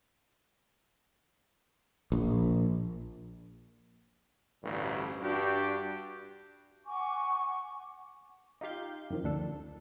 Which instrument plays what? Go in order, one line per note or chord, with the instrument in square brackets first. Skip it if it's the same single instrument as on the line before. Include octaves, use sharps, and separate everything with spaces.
[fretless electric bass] A#1
[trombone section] A1 D2 G2
G2 D4 F#4 G4
[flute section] F#5 G#5 C#6 D6
[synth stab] D#4 F4 G4 F5 G6
F#2 D#3 F3
D2 D4 A4